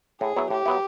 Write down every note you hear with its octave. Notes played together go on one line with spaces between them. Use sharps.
A2 G#4
F#3 B3 E4
A2 G4
F#3 B3 E4